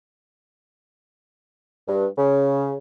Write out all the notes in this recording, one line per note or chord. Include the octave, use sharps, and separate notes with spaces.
G2
C#3